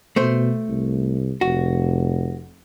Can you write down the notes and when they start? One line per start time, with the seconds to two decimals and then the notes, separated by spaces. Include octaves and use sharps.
0.16 B2 A3 C5
0.68 C2
1.41 F1 F#4